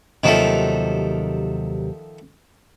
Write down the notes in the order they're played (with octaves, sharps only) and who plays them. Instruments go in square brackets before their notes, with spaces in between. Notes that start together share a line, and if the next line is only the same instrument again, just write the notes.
[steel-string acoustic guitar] D#2 C3 F#3 [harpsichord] D#3 F3 A3